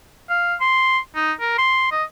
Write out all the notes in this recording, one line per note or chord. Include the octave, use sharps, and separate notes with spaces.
F5
C6
D#4
A#4
C6
D#5